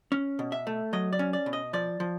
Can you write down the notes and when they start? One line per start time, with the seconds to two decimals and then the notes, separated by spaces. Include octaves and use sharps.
0.12 C#4
0.39 B2
0.52 E5
0.67 A3
0.93 F#3 D#5
1.13 D5
1.19 C#4
1.33 D5
1.46 B2
1.53 D#5
1.73 F3 D5
2.00 F3